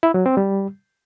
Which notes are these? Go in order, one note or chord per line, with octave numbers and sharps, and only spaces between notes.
E4
F#3
C4
G3